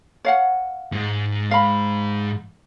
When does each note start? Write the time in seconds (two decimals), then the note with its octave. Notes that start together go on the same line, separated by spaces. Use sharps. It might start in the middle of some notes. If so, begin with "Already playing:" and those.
0.25 C#5 F5 F#5
0.92 G#2 G#3
1.51 F5 B5